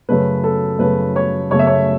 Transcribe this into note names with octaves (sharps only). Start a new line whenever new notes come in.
F#2 C#3 A3 B4
A4
F#2 C#3 A3 B4
C#5
F#2 C#3 A3 C#5
E5
C#5